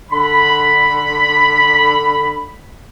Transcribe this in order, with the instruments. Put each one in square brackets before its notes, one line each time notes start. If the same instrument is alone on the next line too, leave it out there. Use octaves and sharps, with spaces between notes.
[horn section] D3 B5